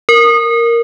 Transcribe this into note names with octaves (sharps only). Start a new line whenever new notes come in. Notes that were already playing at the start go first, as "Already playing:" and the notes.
A#4